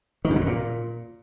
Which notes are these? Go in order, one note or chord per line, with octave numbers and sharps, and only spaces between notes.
D#3
F#2
C#3
A2
A#2